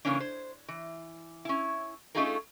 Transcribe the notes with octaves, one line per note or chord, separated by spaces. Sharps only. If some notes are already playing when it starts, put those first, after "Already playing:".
C#3 E3 A#3 C#4 D4
C5
E3
C#4 E4
A3 C#4 D#4 F4 G#4 A#4